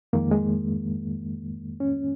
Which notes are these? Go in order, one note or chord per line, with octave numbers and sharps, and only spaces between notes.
F2 D#3 G#3 A#3
G#3
C#4